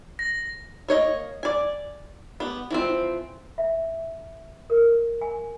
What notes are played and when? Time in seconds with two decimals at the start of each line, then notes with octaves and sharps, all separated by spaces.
0.19 A#6
0.88 A#3 C#5 D#5
1.43 D5 G#5
2.40 B3 G4
2.71 E3 F3 C4
3.58 E5
4.70 A#4
5.21 G#5